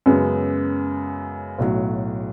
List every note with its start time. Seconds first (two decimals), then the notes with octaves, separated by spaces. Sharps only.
0.06 F#2 C#3 G#3 B3
1.58 B1 A2 F#3